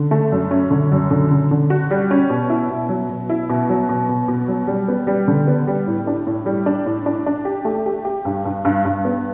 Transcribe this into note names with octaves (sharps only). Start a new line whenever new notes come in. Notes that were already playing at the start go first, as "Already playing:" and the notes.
Already playing: D3
A3
F#2
C#4
D3
F#2
D3
D3
D3
F#4
G3
C#4
B2
E4
B2
F#3
B2
E4
B2
F#3
B2
B2
B2
F#3
G3
B3
G3
D3
B3
G3
A2
D4
A2
G3
D4
A2
D4
D4
G4
A3
G4
G4
G2
G2
G2
G2
B3